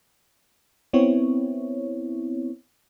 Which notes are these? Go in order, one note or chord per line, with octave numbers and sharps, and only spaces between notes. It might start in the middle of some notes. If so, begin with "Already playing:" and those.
B3 C4 E4 C#5